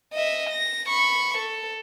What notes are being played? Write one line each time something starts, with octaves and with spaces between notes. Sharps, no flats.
D#5 E5
A#6
B5 C#6
A4